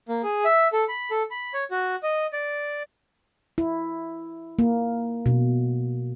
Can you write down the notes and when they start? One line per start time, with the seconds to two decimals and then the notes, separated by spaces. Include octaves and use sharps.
0.08 A#3
0.23 G#4
0.45 E5
0.73 A4
0.88 B5
1.11 A4
1.31 B5
1.54 C#5
1.71 F#4
2.03 D#5
2.33 D5
3.58 E4
4.59 A#3
5.26 B2